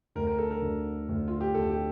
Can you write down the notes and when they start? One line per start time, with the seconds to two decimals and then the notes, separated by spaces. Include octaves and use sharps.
0.15 D2 D3 A#4
0.27 A#4
0.38 A4
0.51 A#4
0.62 D2 D3
1.09 D2 D3
1.28 F4
1.41 G4
1.54 D2 D3 A4
1.70 G4